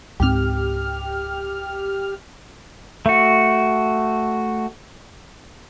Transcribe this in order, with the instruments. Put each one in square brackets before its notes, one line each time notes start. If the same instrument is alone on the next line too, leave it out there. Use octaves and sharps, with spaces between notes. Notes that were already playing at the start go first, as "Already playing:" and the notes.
[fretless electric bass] C#2 G#2 C4 [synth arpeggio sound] G4 F6
[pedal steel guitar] A3 F#4